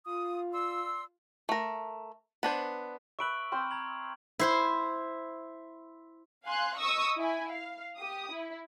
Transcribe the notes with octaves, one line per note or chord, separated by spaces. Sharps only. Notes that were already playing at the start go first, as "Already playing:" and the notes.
F4 D#6
D5 C6 E6
A3 A#4
B3 D4 C5
B4 E5 C#6 D7 F#7
C4 C5 C6 F6
A#5 G#6 F#7
E4 C5 C6
F5 G#5 C6 F#6
D#5 C#6 D#6 E6
E4 G#5
F5
G4 D#6
E4